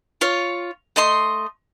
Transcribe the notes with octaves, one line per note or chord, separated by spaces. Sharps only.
F4 C#5
A3 D#5 C6